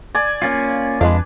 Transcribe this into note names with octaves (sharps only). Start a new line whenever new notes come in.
D5 G#5
A#3 C#4 F4
F2 G#3 D4 B4 D#5 F5